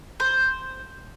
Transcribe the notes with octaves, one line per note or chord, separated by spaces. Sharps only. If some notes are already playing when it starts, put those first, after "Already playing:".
C5